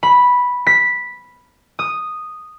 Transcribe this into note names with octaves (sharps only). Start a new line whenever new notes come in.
B5
B6
D#6